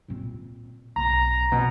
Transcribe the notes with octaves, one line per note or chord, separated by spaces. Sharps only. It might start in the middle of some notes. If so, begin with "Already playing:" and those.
A#2 C4
B1 A#5
B2 C4